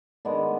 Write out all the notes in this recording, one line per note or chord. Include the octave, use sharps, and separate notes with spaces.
D#3 G#3 B3 D4